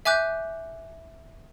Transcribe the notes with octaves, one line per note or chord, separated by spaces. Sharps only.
E5 G#5 D6 F#6 G6